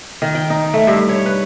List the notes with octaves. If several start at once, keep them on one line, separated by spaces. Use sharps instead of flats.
D#3
G5
D#4
A3
G2
C#5
B4